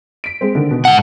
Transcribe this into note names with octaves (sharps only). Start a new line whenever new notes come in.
B6 D7
G#3 C4
D3 D#3
B2
G#2 F#5 A5